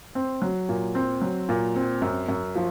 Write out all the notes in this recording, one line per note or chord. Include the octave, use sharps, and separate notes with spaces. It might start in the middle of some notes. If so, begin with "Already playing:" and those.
C4
F#3
A#2
C4
F#3
A#2
C4
F#2
F#2
F3